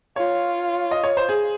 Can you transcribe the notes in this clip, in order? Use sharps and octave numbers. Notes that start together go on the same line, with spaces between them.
F4 C#5
D#5
C#5
C5
G#4